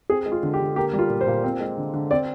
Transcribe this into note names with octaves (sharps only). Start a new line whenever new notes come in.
C4 G#4
G#3
F4
D3
G4
D3
A#3 G4
G3
F4
A#2
C5
A#2
C4
G#3
D3
D3
C4 D5